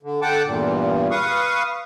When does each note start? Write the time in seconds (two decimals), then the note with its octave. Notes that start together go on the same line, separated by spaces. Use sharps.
0.03 D3
0.22 D3 F#5 G5 A5 D6
0.45 E2 G2 A#2
1.11 B4 F5 C#6 D#6